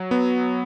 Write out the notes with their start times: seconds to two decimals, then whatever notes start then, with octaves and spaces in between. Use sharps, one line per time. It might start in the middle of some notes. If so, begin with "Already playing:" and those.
Already playing: F#3
0.11 B3